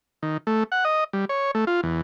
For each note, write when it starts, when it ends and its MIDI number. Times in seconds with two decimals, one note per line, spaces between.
0.23 0.37 51
0.47 0.64 57
0.72 0.84 78
0.85 1.04 75
1.13 1.25 55
1.29 1.51 73
1.55 1.65 57
1.67 1.81 65
1.83 2.01 40